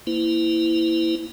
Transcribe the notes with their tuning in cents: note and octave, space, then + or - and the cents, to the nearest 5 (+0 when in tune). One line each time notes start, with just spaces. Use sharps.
A#3 +0 E4 +0 C5 -45